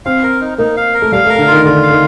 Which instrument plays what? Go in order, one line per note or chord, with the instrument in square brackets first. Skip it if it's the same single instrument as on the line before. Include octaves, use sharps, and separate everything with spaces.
[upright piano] C4 [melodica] F5
[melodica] A#4
D#4
[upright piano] A#3 [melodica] D#4
[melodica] F5
A#4
[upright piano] A3
[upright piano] G3 [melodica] F5
[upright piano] A3
[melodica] A#4
[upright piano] D3
[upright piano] D#3 [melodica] F4
[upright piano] D3 [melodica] F4
[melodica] F5
[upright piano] D#3